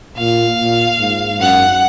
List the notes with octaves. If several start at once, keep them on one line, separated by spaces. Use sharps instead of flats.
A#2 F5
A#2
G#2
F#2 F#5